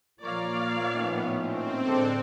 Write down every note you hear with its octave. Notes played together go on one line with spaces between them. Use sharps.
A#2 F3 A#3 A#4 C#5 D5 F5
A2 D#3 B3 C#4
C4
A2 D3 G#3 D4 A4